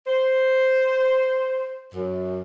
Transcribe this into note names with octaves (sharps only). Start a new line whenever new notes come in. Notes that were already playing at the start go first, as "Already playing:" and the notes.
C5
F#2